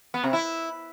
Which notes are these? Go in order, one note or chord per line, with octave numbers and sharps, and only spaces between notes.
B3
C3
E4